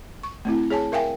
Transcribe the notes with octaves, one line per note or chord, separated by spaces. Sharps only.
C#6
A3 C4 E4
G#4 C#5 G#5 A5
A#4 E5 F5 G5 G#5